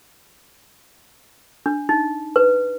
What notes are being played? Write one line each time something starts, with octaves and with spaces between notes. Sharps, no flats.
D4
D#4
B4